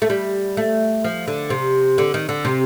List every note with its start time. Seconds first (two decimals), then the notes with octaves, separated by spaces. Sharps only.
0.02 A3
0.10 G3
0.57 A3
1.04 F3
1.28 D3
1.50 C3
1.98 D3
2.14 D#3
2.29 D3
2.45 C3